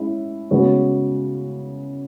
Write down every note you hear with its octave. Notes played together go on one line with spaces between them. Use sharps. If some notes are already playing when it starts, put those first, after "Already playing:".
Already playing: G#3 C#4 E4
C#3 G#3 B3 F#4 C#5